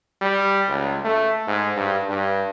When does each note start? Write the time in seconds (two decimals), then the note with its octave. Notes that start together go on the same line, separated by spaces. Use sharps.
0.21 G3
0.69 C#2
1.05 A3
1.48 G#2
1.77 G2
2.09 G2